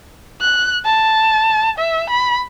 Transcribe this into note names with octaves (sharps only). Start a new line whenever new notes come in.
F#6
A5
E5
B5